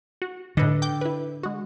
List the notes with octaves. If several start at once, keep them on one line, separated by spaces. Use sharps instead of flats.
F#4
A2 D3 B4 D#5
G5 D6 G6
E4 B4
G#3 F#4